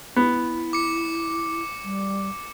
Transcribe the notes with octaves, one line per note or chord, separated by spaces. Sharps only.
B3 E4
D6 C#7
G3